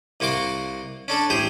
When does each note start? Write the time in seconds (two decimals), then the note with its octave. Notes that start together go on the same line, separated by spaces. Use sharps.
0.20 C2 A#3 F#4 C6 D6
1.08 C#4 D4 A4
1.30 A1 G4 G#4 C5